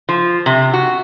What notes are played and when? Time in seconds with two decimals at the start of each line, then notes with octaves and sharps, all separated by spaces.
0.09 F3
0.46 C3
0.73 F#4